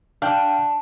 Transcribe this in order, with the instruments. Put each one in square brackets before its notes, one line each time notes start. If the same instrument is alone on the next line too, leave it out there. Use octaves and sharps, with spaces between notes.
[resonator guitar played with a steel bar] D4 [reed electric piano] F5 G5